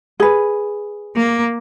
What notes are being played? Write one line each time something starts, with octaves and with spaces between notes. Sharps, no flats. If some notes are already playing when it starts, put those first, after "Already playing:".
G#4 B4
A#3